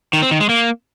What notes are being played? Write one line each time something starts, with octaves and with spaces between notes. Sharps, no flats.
D#3
C4
D#3
G#3
A#3